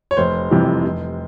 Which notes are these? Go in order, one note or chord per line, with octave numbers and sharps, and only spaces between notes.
C#5
F1 C5
F2 C3 E3 G3
F1